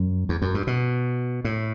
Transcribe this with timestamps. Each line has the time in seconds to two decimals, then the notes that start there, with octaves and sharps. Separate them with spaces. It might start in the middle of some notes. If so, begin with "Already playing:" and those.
Already playing: F#2
0.29 E2
0.42 F#2
0.54 G2
0.67 B2
1.45 A2